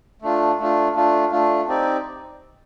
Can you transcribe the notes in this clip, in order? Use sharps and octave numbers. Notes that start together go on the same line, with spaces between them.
A3 D4 F4
A3 D4 F4
A3 D4 F4
A3 D4 F4
C4 D#4 G4 D5